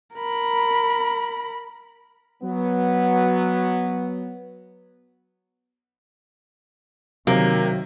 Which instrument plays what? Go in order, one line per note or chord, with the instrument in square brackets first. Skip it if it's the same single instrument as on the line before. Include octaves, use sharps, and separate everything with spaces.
[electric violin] A#4 B5
[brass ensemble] F#3 B3
[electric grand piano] C3 [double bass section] D#3 [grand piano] F#3 [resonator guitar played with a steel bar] A#3